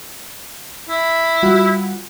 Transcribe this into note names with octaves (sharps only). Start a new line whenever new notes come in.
E4
G3 F4 F#4